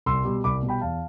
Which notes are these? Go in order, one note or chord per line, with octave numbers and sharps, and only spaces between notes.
C2 C6 E6
B2 G3
C2 B5 D6
B2 G3
G5 B5
E2 F5 A5